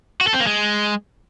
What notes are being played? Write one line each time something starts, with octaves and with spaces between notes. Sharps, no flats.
F#4
A4
C4
A#3
G#3